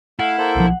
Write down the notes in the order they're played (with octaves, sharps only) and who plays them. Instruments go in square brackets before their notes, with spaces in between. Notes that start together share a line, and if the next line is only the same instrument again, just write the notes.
[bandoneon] A3 F5 [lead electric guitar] E4 [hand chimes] F#5
[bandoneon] A#3 A4 C5
[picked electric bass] B1 F3